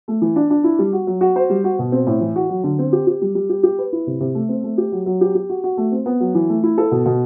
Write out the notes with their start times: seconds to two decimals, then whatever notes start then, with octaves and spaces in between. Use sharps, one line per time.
0.08 A3
0.22 E3
0.36 D4
0.50 D4
0.64 E4
0.79 G3
0.93 F#4
1.07 F#3
1.21 F#4
1.36 C5
1.50 G3
1.64 F#4
1.79 B2
1.92 C4
2.07 A2
2.21 E3
2.36 F#4
2.49 F#3
2.64 D3
2.79 C4
2.93 G4
3.07 G4
3.21 G3
3.35 G3
3.49 G4
3.63 G4
3.79 B4
3.92 E4
4.07 C3
4.20 C3
4.35 A3
4.49 C4
4.63 A3
4.78 G4
4.92 F#3
5.06 F#3
5.21 G4
5.35 G4
5.49 F#4
5.64 F#4
5.77 A3
5.92 C4
6.06 B3
6.20 F#3
6.35 E3
6.49 A3
6.63 E4
6.78 A4
6.92 B2
7.06 B2